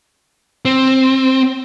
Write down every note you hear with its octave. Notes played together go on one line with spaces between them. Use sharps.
C4